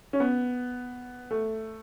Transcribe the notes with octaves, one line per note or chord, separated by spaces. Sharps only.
C#4
B3
A3